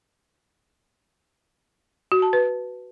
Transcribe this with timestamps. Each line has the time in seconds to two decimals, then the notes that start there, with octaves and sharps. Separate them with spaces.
2.12 F#4
2.22 A5
2.33 B4